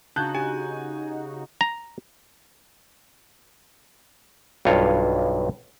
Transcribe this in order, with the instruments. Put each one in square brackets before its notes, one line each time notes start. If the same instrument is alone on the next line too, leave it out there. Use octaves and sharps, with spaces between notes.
[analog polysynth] C#3 D#4 F#4 [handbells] D4 F5 [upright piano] A5 F#6 G6
[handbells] G4 [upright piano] G#5
[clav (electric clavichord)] A#5
B1 G2 F4 C#5